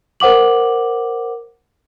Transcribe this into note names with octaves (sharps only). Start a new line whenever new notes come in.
A#4 C5 F#5 D6 F#7